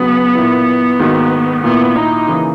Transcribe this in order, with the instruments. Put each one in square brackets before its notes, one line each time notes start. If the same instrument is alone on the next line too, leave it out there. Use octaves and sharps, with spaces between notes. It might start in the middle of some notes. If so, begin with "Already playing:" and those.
Already playing: [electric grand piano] C#3 F#3 C#4 F#4 [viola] B3
[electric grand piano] A#2 A#3 E4
G#2 D#3 A#3 D#4 F#4
[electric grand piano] A#2 A#3 E4 [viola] B3
[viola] D#4
[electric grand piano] C#3 E3 A#3 C#4